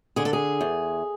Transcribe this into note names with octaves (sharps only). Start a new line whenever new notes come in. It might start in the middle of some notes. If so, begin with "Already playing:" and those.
D3 G#4
A4
G#4
E2